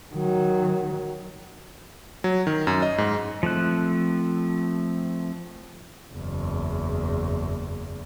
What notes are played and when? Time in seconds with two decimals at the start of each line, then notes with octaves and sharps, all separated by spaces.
0.15 D#3 F#3
2.24 F#3
2.47 D#3
2.67 F#2
2.82 D#5
2.98 G#2
3.43 F3 A3 C4 F#6
6.14 F#1 E2